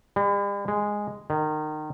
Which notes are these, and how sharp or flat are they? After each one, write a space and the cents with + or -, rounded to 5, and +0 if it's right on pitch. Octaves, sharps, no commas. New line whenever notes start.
G3 +45
G#3 -5
D#3 -25